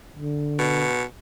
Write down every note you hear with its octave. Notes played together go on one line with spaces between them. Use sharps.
D3
B2